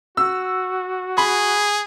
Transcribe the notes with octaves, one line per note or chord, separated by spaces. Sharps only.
F#4 E6
G#4 B5